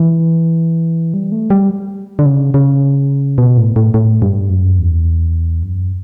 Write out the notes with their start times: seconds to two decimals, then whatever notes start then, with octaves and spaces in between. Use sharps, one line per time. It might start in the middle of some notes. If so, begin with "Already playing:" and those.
Already playing: E3
1.14 G3
1.32 A3
1.50 G3
2.19 D3
2.26 C#3
2.54 C#3
3.38 B2
3.57 A2
3.76 A2
3.94 A2
4.22 G2
4.50 F#2
4.79 E2
5.63 F#2